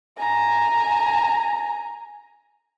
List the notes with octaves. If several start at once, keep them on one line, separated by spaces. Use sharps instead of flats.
G#5 A#5